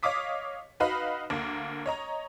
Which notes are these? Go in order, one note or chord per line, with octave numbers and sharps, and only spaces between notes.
C#5 D#5 F5 D6 D#6 B6
D#4 F#4 B4 D#5 F5 B5
D2 A#3
C#5 D#5 A#5